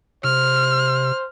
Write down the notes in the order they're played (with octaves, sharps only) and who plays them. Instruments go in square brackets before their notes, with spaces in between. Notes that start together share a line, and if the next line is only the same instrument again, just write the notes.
[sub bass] C3 [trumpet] C5 [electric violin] F6